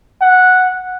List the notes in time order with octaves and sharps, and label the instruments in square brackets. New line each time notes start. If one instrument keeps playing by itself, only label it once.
[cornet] F#5